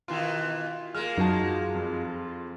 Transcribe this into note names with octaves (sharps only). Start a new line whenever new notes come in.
B2 D#3 E3 F4
G#3 A#3 F6
F#2 D#4 F#4 A5
F2